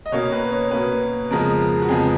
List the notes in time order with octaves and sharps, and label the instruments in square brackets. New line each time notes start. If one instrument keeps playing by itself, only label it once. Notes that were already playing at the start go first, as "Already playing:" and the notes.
[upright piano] D#5
B2 A#3 C#4 C#5
B4
C#5
B2 A#3 C#4 B4
F2 C#3 F3 G#3 B3 A#4
F#4
F2 C#3 F3 G#3 B3 G#4